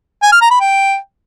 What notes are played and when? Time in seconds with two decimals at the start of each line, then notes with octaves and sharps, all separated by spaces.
0.23 G#5
0.32 F6
0.41 A#5
0.51 B5
0.60 G5